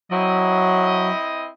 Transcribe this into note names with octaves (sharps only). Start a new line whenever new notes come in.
F#3 C4 E4 D#5